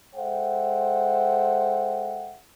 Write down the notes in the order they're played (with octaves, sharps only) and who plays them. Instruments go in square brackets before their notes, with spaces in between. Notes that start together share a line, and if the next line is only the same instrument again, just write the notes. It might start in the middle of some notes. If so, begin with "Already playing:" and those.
[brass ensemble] G#3 A4 C5 E5 F#5 G5